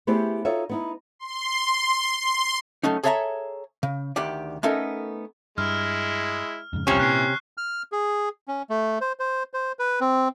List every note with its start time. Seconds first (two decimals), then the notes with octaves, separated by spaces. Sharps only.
0.07 A3 B3 E4 G4 G#4 C5
0.45 D#4 F4 F#4 A4 C#5 E5
0.69 B3 D#4 E4
1.19 C6
2.19 C6
2.83 F#3 A3 C#4 D#4
3.03 G#4 A4 C#5 E5 F5 A#5
3.83 C#3
4.16 D2 D#3 G4 D5
4.63 A3 B3 C#4 D#4 A4 A#4
5.58 G2 G#3 E4 F6
6.73 F2 G#2 C#3
6.87 E1 C2 C3 F3 C#4 C#5 C#6 F6
6.99 A#2 E3 F#6 C7
7.58 F6
7.92 G#4
8.48 C#4
8.70 A3
9.01 C5
9.19 C5
9.54 C5
9.79 B4
10.01 C4